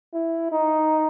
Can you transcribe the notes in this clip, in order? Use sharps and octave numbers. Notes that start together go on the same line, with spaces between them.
E4
D#4